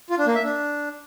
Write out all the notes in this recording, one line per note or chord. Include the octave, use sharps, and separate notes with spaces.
F4
D4
A#3
E5
D4